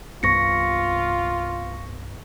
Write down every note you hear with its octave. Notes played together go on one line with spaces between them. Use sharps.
C2 G2 B3 F4 C#6 A#6 C#7